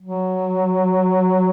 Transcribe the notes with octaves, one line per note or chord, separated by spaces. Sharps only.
F#3